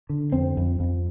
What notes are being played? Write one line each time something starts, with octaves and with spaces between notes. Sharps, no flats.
D3
F2 C4
F2
F2